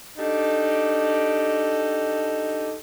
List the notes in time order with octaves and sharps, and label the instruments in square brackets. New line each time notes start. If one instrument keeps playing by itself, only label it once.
[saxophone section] D4 D#4 G4 A4